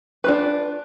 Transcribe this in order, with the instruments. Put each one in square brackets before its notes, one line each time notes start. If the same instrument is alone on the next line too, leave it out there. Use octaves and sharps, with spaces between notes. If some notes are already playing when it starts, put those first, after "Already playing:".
[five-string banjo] D4 F4 B4